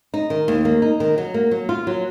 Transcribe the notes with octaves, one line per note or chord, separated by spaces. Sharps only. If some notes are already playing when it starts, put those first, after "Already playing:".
D#4
D#3
D#2
A#3
D#4
D#3
F#3
A#3
F#3
F4
F#3